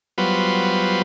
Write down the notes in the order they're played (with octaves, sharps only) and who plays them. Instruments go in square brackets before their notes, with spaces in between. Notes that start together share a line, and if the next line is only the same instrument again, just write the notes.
[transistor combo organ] F#3 G3 B3 F4 B4 C5